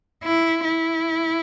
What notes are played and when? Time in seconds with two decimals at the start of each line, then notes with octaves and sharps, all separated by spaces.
0.24 E4
0.65 E4